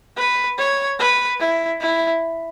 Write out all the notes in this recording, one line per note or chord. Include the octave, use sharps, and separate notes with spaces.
B4
C#5
B4
E4
E4